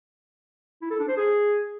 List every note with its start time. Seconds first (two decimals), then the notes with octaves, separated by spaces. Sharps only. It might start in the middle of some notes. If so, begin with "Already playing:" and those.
0.82 E4
0.91 A4
0.99 D4
1.08 C5
1.17 G#4